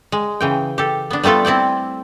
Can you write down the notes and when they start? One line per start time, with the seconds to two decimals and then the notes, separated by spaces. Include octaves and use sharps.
0.12 G#3
0.41 C#3 E3 G5
0.78 G4 A4
1.11 B3 D4
1.23 G3 A3 B3 F4 A4
1.45 C4 E4 D5 G5